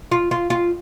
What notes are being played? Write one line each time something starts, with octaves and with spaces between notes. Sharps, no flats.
F4
F4
F4